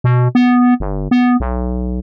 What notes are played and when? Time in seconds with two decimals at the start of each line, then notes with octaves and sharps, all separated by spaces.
0.04 B2
0.35 B3
0.80 G1
1.11 B3
1.40 B1